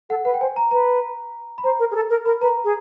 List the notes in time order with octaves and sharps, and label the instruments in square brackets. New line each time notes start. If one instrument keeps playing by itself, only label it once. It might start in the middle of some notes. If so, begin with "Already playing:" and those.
[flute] A4 [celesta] F#5
[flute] B4 [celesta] F#5
[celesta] G5
[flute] C5 [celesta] G#5
[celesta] A#5
[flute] B4 [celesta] A#5
[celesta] B5
[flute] C5 [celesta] A#5
[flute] A#4
G#4
A4
A#4
[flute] A#4 [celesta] B5
[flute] B4 [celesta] A#5
[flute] G#4